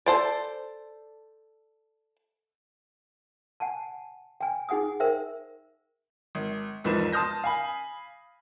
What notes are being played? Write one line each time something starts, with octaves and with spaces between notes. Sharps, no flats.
A4 C5 D5
F#5 G#5 A5
G5 G#5
D#4 G#4 F#5 G#5 D#6
A#4 C5 E5 G5
G#1
E1 G#2 F3 B4 E7
A5 C6 D#6 F6 G6 A#6
F5 G#5 B5